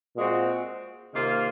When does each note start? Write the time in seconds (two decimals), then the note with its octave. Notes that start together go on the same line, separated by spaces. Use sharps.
0.16 A#2 G#3 C4 F#4
1.13 C3 D#3 A#3 F4